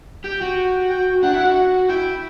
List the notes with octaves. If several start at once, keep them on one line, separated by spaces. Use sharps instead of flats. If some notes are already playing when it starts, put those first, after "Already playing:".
G4 G5
F#4
G5
D4 F#5
E4
F#4
E4 G5